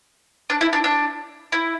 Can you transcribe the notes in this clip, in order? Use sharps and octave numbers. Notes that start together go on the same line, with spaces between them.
D4
E4
D4
D4
E4